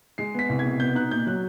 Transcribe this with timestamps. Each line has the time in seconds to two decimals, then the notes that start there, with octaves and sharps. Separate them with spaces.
0.18 G#3 C7
0.34 B3 B6
0.49 C2
0.59 G#6
0.65 B2
0.80 B3 G6
0.95 D#4 F#6
1.11 A#2 G6
1.27 F#3 F#6